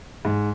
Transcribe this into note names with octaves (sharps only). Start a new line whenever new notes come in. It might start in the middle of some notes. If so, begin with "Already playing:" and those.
G#2